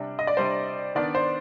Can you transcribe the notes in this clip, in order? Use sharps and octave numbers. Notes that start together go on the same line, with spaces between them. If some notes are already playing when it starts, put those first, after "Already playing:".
Already playing: C3 G3 D4
D#5
D5
C3 G3 D4 C5
D#3 B3 D4 D5
C5